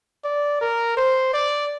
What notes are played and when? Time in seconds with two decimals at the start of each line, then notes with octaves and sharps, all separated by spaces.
0.24 D5
0.61 A#4
0.97 C5
1.33 D5